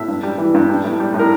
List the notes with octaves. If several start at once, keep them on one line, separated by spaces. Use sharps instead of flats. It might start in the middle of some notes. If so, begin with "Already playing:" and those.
Already playing: A2 E5
G2
G3
E3
G2
G3
A2
G3
A2
A#4